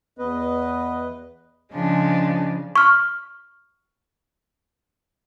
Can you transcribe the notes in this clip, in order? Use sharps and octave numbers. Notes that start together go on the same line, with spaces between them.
E2 B3 B4 D#5
C#3 F3 G#3 D4
C#6 F6